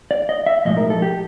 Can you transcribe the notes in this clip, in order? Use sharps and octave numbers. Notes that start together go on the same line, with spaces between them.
D5
D#5
E5
B1 A2 F3 G#3 D#5
A#4
A4
G4